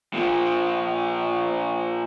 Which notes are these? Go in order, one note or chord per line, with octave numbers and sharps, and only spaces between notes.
A#2 F3